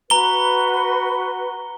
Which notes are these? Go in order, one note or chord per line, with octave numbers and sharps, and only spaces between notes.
F#4 B4 A#5 G7